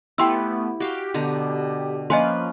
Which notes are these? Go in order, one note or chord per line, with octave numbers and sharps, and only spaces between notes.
A3 B3 E4 G4 G5 C6 E6
F#4 G4 F5
B2 D3 A#5
F3 A#3 C#4 B4 D#5 G#5 C6